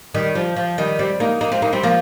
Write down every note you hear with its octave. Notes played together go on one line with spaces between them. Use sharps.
D#3 G3
F3
F3
D#3 G3
G3 C4
A#3 D#4
A#3 D#4
C4 F4
A#3 D#4
G3 C4
F3 A#3